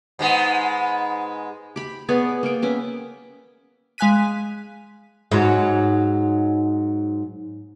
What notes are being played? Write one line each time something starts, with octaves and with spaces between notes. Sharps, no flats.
G#2 G#3 B3
G4 B5
B3 G#4 C#5 D5
A#3 G5
B3 C#4 E5
G#3 F5 G#5 F#6 B6 D#7
G#2 F#3